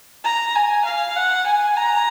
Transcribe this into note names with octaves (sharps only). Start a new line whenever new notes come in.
A#5
G#5
F5
F#5
G#5
A#5